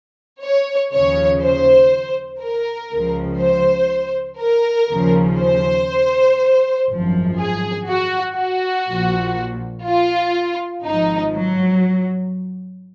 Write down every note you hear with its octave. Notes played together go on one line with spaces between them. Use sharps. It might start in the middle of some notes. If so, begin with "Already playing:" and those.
C#5
D#2 C#3 F3 C#5
C5
A#4
C#2 C#3 F3
C5
A#4
D#2 C#3 F3
C5
G#1 F#2 F3
G#4
F#4
F#4
A#1 A#2 F3
F4
G#1 G#2 F3 D#4
F#3